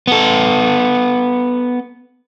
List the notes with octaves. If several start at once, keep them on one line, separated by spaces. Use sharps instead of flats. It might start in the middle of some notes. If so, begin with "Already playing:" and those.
B3 A4